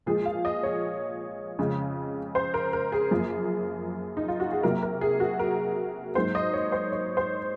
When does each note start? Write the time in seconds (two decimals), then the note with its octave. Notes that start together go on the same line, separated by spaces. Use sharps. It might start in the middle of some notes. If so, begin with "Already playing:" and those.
0.06 A#2 F3 G#3 G#4
0.25 F5
0.45 D#5
0.63 C#5
1.59 F2 C#3 G#3
2.35 C5
2.54 A#4
2.73 A#4
2.92 G#4
3.11 F#2 F3 A#3
4.17 D#4
4.28 F4
4.40 F#4
4.52 G#4
4.63 C3 F#3 A#3 A#4
4.82 A#4
5.01 G#4
5.20 F#4
5.39 A#4
6.15 G#2 F#3 A#3 C5
6.35 D#5
6.53 C#5
6.72 C5
6.92 C#5
7.17 C5